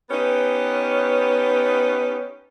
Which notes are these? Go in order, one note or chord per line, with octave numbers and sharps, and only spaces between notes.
B3 C#4 D#4 G4 B4